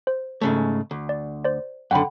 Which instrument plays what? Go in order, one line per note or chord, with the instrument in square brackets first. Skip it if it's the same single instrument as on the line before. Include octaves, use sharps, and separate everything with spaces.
[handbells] C5
[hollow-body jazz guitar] G#2 C#3 A3
D2
[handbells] D5
C5 D5
[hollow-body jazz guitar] F#2 D3 [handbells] F#5 G5 B5